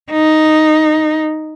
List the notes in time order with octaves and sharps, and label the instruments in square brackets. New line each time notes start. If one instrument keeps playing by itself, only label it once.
[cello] D#4